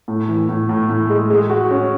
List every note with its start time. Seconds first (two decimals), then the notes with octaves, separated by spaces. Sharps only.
0.08 A2
0.29 E3
0.49 A2
0.69 A2
0.90 A2
1.10 G#3
1.30 G#3
1.50 F#4
1.71 C#4